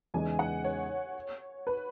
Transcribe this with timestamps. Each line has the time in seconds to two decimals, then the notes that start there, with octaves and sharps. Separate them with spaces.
0.14 E2 C#3 E3 G#3 D#4 G#5
0.39 F#5
0.64 C#5
1.67 B4